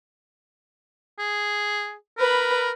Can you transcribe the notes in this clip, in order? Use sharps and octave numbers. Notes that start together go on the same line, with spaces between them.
G#4
A#4 B4 B5